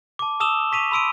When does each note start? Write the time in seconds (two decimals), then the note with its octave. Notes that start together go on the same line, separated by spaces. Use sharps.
0.19 A5 D6
0.40 A5 D#6 E6 E7 F7 G7
0.72 C#6 B6 D#7 F7
0.91 B5 C6 E6 D7 D#7